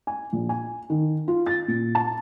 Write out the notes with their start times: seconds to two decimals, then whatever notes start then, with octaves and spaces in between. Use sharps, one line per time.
0.07 G#5
0.33 A#1
0.49 G#5
0.90 D#3
1.28 F4
1.46 A6
1.68 A#2
1.95 A5